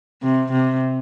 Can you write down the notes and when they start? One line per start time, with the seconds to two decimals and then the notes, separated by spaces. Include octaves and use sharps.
0.23 C3
0.51 C3